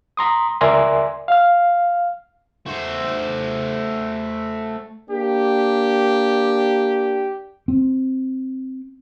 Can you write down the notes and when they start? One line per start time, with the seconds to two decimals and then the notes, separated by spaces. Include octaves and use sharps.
0.17 A#5 C6 D#6
0.61 C#2 A#4 D5 E5 G#5 C6
1.28 F5 F6
2.66 A3 C5
5.09 A#3 D4 G4
7.68 C4